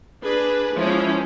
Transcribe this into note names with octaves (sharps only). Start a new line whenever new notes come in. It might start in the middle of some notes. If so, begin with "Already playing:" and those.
D4 G#4 B4
E3 F3 G#3 C#4 E4